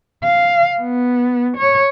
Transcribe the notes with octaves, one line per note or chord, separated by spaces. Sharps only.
F5
B3
C#5